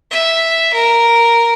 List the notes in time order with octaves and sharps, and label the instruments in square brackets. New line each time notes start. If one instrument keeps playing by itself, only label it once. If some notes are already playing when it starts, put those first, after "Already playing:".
[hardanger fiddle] E5
A#4